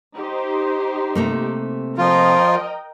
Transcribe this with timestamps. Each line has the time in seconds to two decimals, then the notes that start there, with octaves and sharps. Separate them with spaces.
0.16 D#4 G4 C5
1.15 C3 A3 A#3
1.98 F3 F4 A#4 D#5 G5